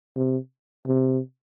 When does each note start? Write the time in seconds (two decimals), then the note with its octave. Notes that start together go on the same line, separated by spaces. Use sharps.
0.16 C3
0.87 C3